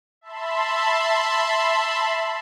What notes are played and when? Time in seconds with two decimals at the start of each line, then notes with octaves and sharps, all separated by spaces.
0.21 E5 A5 B5 C6